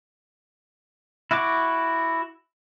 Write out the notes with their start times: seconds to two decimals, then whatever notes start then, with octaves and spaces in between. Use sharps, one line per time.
1.31 E4 F#4 C#6 D6